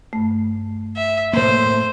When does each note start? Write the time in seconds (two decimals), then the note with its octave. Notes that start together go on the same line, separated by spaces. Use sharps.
0.13 G2 A3
0.97 E5
1.33 A2 A#3 C5